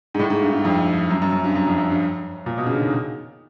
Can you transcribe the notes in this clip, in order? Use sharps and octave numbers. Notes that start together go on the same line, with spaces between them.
G#2
A2
G#2
G2
G2
F2
F#2
F#2
F#2
G2
F#2
F2
F#2
G2
A#2
B2
C#3
D3
D#3